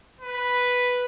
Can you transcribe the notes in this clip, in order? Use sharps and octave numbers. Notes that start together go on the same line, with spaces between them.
B4